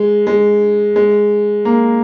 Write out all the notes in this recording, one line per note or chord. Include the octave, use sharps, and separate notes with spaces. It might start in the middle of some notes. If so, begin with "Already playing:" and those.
Already playing: G#3
G#3
G#3
A#3